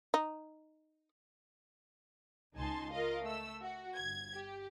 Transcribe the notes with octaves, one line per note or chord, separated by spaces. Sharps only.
D#4
C#2 D#4 G#5 A5 C6
F4 A#4 D#5 F5
A3 E6
F#4
G1 G#6
G4